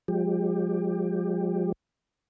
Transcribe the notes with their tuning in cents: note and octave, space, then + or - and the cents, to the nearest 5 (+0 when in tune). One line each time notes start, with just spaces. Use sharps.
F3 +35 G#3 -15 G4 +15